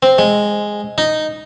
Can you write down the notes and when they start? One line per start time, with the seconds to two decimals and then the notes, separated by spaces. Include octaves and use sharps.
0.03 C4
0.18 G#3
0.98 D#4